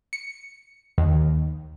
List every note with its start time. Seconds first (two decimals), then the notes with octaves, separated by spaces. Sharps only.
0.13 C#7
0.98 D#2